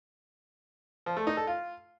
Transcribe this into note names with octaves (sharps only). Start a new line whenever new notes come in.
F3
A3
D#4
A4
F4